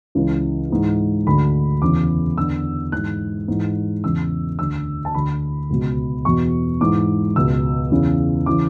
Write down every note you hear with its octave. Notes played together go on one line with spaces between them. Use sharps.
C#2 C#3 E3
G#2 E3
D2 D3 B5
E2 C#3 E3 D6
E2 D3 E6
G#2 E3 F#6
G#2 E3
E2 C#3 E3 E6
D2 D3 E6
A5
D2 D3 B5
C#2 B2
E2 B2 C#6
G#2 E3 D6
C#2 B2 E6
E2 C#3 E3
C#3 E3 D6